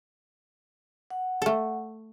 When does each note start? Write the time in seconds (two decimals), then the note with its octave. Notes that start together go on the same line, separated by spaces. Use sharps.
1.11 F#5
1.42 A3 A4